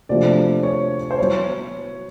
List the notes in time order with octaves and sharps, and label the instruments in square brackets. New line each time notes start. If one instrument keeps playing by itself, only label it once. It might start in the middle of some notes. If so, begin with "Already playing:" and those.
[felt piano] C3 F3 A3 D4 F#4 [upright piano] D5
[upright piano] C#5
C5
[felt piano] F#3 B3 E4 [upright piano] C#5